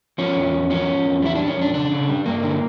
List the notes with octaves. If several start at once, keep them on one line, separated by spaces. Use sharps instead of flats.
F3 C#4
E2
E2
F3 C#4
F3
E2
G3 E4
G3 D4
C#4
F2 D4
C#3 D4
C#3
G3
G2 A#3
D3